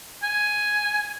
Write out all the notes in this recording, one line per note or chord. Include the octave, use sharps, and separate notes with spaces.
G#5